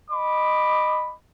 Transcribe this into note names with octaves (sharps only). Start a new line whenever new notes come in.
D#5 B5 D6